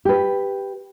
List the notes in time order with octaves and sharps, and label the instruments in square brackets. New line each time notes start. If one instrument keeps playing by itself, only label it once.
[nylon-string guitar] G4 B4